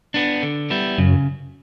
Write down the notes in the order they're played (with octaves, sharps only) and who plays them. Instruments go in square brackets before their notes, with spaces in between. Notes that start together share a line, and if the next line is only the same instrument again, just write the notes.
[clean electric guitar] B3 D4
D3
G3 B3 E4
[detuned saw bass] F#2 [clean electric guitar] C#3